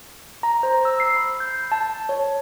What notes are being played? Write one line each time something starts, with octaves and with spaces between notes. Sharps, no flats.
A#5
C5
E6
C7
B5
G6
A5
C#5